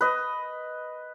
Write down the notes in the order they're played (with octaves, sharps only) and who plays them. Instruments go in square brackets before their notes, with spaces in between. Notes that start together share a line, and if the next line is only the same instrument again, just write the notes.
[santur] B4 D#5